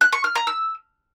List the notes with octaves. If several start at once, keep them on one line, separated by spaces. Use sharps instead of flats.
F#6
C#6
F6
A#5
E6